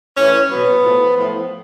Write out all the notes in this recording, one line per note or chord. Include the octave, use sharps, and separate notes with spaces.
A2 E3 C#4
B2 F#3 B3
A2 F3
A2 F3